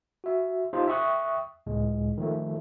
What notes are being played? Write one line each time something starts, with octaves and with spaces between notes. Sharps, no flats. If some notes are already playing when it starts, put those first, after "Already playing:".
F#4 E5
D#4 F4 G4 C5
E5 G5 C#6 D#6 F#6
C#2 A2 G#3
D#3 F3 A3